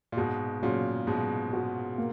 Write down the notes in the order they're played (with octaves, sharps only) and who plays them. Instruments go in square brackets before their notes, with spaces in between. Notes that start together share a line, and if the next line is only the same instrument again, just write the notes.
[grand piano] A#2
[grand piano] G#2 B2 [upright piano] F#4
[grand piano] A#2 C#3 [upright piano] F#3
[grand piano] G#2 B2 [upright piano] F#3
[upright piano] F#4
A#3